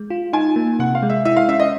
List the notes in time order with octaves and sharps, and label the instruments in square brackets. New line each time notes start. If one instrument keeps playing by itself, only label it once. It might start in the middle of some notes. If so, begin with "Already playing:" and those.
Already playing: [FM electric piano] G#3
F4
[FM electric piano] D#4 [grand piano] G#5
[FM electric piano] A#3
[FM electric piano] C3 [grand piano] F#5
[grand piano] F5
[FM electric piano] G#3
[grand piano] E5
[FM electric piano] E4 [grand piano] E5
[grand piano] F5
[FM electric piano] C#4 [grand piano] E5
[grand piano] D#5